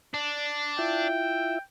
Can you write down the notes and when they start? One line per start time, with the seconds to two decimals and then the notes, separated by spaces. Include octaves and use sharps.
0.14 D4
0.79 E4 F4 E5 G5